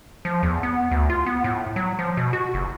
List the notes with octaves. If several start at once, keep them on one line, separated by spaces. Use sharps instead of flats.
F3
E2
B3
D2
F4
B3
A2
F#3
F3
B2
F#4
F#1